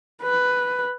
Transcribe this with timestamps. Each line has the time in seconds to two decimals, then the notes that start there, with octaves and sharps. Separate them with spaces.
0.23 B4